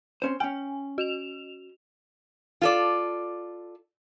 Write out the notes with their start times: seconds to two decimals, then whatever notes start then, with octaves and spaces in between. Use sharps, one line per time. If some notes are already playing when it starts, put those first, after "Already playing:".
0.22 C4 C#4 C5
0.40 C#4 G5 G#5
0.98 F#4 E7 F7
2.61 F4 A4 D5